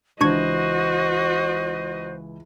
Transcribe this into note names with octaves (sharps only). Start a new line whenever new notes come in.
C#2 E3 D4 F#4 C5 D#5 C#6 G#6